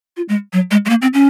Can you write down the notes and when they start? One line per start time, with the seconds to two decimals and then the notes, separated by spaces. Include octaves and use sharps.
0.17 F4
0.29 G#3
0.53 F#3
0.71 G#3
0.85 G#3
0.90 A#3
1.02 C4
1.14 C#4